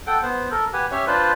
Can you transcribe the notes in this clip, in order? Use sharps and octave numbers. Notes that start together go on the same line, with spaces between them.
A4 F#5 G5
B3 C5 F#5
A4 A#4
G4 B4 F#5 G#5
C#4 G4 C#5 E5
D4 F4 B4 C5